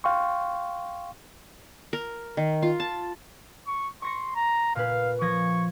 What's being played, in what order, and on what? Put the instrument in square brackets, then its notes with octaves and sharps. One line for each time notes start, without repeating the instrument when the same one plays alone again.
[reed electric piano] F5 G5 C6 C#6
[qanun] A#4
D#3
F4
A5
[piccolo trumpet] C#6
[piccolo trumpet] C6 [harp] C#6 A#6 C#7
[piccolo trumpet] A#5
[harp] A#2 B4 [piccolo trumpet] F5
[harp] F3 G#6 A#6 [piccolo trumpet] C#6